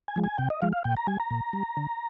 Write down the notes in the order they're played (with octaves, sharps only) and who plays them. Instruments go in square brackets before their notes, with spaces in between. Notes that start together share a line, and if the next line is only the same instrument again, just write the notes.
[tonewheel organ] G#5
F3 G#3
G#5
C3 G5
D#5
F3 G#3 F5
F5
A#2 G5
A#5
G3 G#5
A#5
A#2
G3
D3